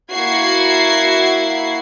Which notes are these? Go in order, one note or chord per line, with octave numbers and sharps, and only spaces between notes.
A#3 E4 F#4 G#6 C7